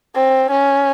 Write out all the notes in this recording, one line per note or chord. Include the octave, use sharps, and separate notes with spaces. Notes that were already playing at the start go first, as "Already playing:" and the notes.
C4
C#4